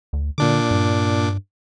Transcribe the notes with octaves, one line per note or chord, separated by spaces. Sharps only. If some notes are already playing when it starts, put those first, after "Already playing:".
D2
A#2 D3 D4 D6
G2